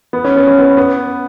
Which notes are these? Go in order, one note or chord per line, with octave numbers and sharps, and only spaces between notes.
B3
C#4
B3
C#4
B3
B3